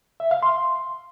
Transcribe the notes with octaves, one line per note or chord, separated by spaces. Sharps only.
E5
F5
C6